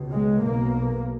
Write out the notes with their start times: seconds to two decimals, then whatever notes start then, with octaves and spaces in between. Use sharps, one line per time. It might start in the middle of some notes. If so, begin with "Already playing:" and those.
Already playing: C#2 B2
0.11 G#3
0.42 B1 B2 A#3